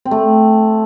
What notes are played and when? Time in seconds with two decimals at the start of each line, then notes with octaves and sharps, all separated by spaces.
0.05 C4
0.11 A3